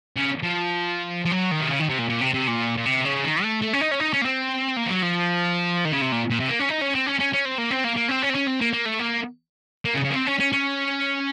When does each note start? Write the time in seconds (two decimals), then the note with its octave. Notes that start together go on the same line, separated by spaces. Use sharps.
0.16 C#3
0.43 F3
1.25 F3
1.31 F#3
1.51 D#3
1.61 C3
1.70 C#3
1.80 D#3
1.89 C3
1.99 A#2
2.09 A#2
2.21 C3
2.34 C3
2.47 A#2
2.77 A#2
2.86 C3
3.05 C#3
3.24 D#3
3.43 A3
3.62 A3
3.73 C#4
3.81 D#4
3.91 C#4
4.00 D#4
4.13 C#4
4.22 A#3
4.25 C4
4.77 A#3
4.86 F3
4.90 F#3
5.03 F3
5.85 D#3
5.92 C#3
6.01 C3
6.12 A#2
6.30 A#2
6.40 C3
6.49 A#3
6.60 C#4
6.69 D#4
6.82 C#4
6.95 C4
7.07 C#4
7.20 C#4
7.33 C#4
7.45 C4
7.58 A#3
7.71 C4
7.84 A#3
7.97 A#3
8.09 C4
8.23 C#4
8.30 C4
8.35 C#4
8.47 C4
8.61 A#3
8.73 A#3
8.86 A3
8.99 A#3
9.85 A#3
9.94 C#3
10.04 C#3
10.10 A#3
10.14 C4
10.27 C#4
10.40 C#4
10.52 C#4